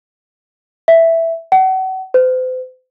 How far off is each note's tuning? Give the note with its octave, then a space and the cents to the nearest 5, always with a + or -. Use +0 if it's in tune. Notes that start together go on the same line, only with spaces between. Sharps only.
E5 +0
F#5 +35
C5 -40